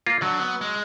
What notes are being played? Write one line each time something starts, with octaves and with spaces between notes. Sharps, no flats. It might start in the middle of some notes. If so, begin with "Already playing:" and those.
A#3 F4
D3 F#3
B3
G#3